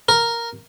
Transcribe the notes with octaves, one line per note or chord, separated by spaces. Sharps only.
A#4